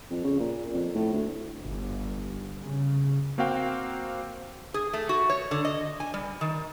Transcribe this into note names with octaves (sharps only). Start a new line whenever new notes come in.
F2
C#3
A#2
F2
A2
D2
G1
C#3
A#3 C4 F#4 F5 G5
G#4
A3
F#4
C#5
D3
D#5
G#5
G3
D#3